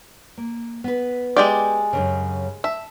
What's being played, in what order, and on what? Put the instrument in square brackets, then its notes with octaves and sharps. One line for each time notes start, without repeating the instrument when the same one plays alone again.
[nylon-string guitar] A#3
B3 B4
[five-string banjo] G#3 G4 D5
[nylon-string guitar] F#2 A#2 C#3
[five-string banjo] E5 [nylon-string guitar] A5